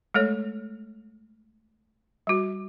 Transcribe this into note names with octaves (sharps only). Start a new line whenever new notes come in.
G#3 A3 A4 C#5
G3 F#4